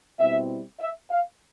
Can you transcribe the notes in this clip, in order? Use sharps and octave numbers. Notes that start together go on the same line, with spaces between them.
B2 G3 C4 E4 E5
E5
F5